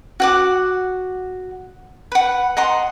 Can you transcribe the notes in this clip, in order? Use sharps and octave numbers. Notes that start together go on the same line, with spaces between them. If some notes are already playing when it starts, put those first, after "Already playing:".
F#4 F#5 D6
B4 F#5
D#5 F#5 A#5 C6